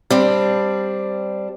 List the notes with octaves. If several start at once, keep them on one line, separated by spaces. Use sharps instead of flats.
G3 C4 D4